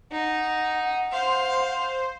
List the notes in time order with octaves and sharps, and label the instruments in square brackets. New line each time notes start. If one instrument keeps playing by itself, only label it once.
[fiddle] D#4 [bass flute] F#5
[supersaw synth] C5 [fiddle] F5